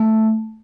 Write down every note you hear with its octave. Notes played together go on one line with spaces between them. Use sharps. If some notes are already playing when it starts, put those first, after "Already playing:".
Already playing: A3